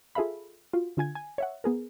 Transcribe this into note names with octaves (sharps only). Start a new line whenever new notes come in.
F4 G#4 A4 E5 F5 B5
F4 F#4
D3 F4 G#5 G#6
G#5
C#5 E5 F#5
B3 G#4 A#4